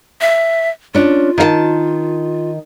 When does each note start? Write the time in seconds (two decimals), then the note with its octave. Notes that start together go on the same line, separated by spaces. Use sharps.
0.21 E5
0.95 C#4 D4 F4
1.38 D#3 F5 A5